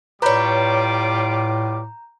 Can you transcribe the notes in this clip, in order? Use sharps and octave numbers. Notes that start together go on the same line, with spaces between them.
A2 G3 F4 B4 C#5 A#5 D6 G6